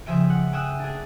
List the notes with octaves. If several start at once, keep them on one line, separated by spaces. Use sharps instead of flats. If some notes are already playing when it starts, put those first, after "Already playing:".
C#3 F3 G#4 E5 G5 D7
F#5
G5 G#5 D#6 E6 F#6 E7
D4 G#4